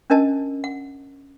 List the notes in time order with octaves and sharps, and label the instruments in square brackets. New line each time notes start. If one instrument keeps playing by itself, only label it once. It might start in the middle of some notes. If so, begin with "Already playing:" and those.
[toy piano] C#4 D4 A#4 D#5 A5
F#5